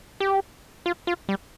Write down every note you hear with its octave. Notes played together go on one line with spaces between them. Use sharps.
G4
F4
F4
G3